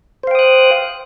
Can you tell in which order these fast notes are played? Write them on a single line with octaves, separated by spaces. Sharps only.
C5 F5 G5 D#6 F#6